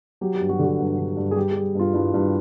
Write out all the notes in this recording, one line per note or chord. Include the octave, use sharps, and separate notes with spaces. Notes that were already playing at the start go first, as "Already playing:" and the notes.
F#3 G4
G4
G2
F#4
D3
F#4
G2
D3
G2
G#4
G3 G4
G3 G#4
G2 F4
G2 E4
G2